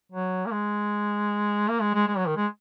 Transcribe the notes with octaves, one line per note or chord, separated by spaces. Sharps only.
F#3
A#3
G#3
A#3
G#3
G#3
G#3
F#3
D#3
G#3